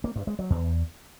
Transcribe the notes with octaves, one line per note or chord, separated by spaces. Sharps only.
A#3
G2
G#3
F#3
E2